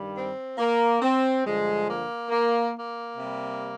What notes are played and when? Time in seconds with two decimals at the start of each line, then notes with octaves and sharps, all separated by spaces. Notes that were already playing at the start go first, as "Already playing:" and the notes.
Already playing: G2 D#3 G3
0.14 C4
0.58 A#3
1.01 C4
1.44 G2 D3 F3 G#3
1.88 A#3
2.30 A#3
2.74 A#3
3.17 C3 G3